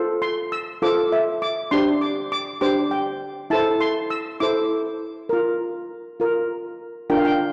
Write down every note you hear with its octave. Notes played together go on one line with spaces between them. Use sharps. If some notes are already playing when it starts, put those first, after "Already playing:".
Already playing: F4 A4 C5
C6
E6
F4 A4 C5 D6
E5
D6
D4 G4 C5 C6
D6
D6
D4 G4 C5 D6
G5
E4 A4 C5 A5
C6
E6
E4 A4 C5 D6
F4 A#4
F4 A#4
D4 F4 A#4 G5
F5
G5